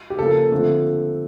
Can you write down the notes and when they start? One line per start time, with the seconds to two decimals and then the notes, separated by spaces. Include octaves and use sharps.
0.10 G4
0.19 C#3 F3 A#3 A4
0.52 D3 F3 A3 C4